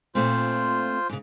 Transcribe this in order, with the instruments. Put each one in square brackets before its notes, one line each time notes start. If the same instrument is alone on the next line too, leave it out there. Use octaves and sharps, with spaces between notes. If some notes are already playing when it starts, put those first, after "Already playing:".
[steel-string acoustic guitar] A#2 A3 C4 [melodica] F4 C5
[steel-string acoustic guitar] G#2 C#3